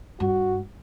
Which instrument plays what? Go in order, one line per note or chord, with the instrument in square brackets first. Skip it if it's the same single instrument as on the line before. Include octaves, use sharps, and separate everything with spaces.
[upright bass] G2 [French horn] F#4